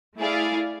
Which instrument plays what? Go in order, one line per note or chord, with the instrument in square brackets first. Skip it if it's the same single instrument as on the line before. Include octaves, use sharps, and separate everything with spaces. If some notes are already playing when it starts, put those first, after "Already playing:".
[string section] A3 E4 G#4 D5 F5